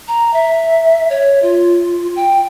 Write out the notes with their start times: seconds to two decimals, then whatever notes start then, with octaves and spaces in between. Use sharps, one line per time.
0.08 A#5
0.33 E5
1.10 C#5
1.42 F4
2.16 G5